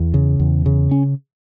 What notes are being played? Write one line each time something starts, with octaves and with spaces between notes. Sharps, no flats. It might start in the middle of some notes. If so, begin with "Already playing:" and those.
Already playing: E2
C#3
E2
C#3
C#4